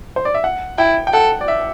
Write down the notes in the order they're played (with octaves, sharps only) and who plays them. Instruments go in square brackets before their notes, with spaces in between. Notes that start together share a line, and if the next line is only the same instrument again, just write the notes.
[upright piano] C5
D5
E5
F#5
[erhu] E4 [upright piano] G5
[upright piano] G5
[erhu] A4 [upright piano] F#5
[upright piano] D5
E5